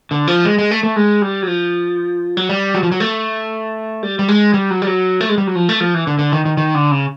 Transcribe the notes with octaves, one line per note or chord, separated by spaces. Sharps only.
D3
F3
G#3
G#3
A3
A3
G#3
G3
F#3
F3
F#3
G3
F#3
F3
F#3
A3
G3
G3
G#3
G3
F#3
G3
F#3
A3
G#3
G3
F#3
F3
A3
F3
E3
D3
D3
D#3
D#3
D#3
D3
C#3